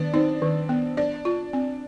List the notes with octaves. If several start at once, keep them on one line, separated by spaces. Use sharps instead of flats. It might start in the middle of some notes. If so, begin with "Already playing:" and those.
Already playing: D#3 B3 D4
C4 D#4
D#3
B3
D4 D5
F4
C4